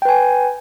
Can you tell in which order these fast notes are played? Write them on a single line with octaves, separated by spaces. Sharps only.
G5 B4 G#5